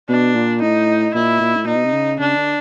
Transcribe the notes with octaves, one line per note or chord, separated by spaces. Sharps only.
B2 D4
A#2
A2 D#4
A#2 E4
A#2
A2
A#2 D#4
B2
C3
C#3
C#3 D4
D3